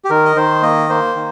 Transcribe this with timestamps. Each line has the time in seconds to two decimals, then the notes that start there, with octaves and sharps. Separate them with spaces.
0.04 G4
0.10 D#3 A#4
0.25 D#5
0.36 D#3 C5
0.63 A#3 D#5
0.90 A#3 C5
1.16 D#3